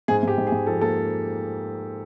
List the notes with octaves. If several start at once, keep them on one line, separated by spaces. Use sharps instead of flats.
G#2 G#4
G#2 G4
G#2
G#4
G#2
F3 A4
A#3 A4